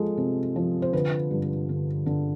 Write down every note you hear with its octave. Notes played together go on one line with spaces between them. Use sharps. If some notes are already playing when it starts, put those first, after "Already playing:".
Already playing: F3 G#3 A4
C3
F3
C5
D3 B4
G2
D3
D3